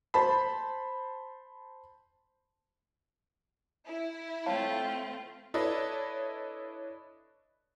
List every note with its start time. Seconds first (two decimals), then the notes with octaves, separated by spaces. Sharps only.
0.14 C5 A5 B5
3.86 E4
4.46 A3 C4 F4 C#5 F5 A5
5.54 D4 E4 A4 B4 C#5 D#5